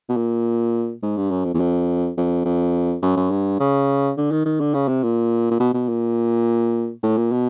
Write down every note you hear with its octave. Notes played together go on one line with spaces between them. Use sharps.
B2
A#2
G#2
G2
F#2
F2
E2
F2
F2
F2
F#2
F#2
G2
C#3
D3
D#3
D#3
D3
C#3
C3
A#2
A#2
B2
B2
A#2
A2
A#2
B2